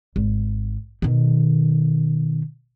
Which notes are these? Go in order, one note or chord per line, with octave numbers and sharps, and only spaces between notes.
G#1
B2 D#3